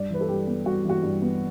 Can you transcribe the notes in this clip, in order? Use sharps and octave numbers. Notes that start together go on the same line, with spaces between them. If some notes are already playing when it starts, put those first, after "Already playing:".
Already playing: G2 D5
E3 B4
A4
G2 G4
B3
G2 F#4
E3 F#4
G2
B3